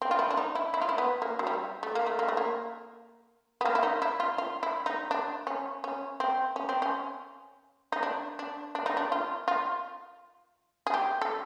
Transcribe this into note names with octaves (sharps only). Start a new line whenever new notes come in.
C4
F4
E4
D4
D#4
E4
E4
F4
E4
B3
A#3
F#3
G3
A3
A#3
A3
A#3
A3
A#3
B3
A#3
E4
D#4
E4
F4
F4
E4
D#4
D4
C#4
C#4
C4
C#4
C4
C#4
D#4
D4
D4
D4
D#4
D4
F4
F4
G#4
G4
A4